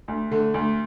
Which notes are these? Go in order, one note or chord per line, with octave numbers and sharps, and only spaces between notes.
D2
D3 A3
D2